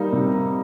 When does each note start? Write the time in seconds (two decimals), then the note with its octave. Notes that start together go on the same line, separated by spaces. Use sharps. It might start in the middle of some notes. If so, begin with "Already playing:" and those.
Already playing: G3 A#3 D#4
0.13 C3